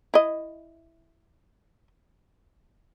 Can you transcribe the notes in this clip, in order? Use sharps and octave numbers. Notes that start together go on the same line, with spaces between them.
E4 D#5